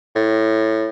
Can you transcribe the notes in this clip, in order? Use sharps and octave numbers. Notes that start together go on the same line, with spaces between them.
A2